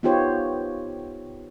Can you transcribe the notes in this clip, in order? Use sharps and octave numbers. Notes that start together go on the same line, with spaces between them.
B3 D#4 F4 G4 C5 C#5